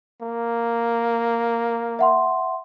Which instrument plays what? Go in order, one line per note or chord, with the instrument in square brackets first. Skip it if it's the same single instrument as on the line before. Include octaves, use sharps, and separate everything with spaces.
[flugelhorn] A#3
[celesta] E5 F#5 C6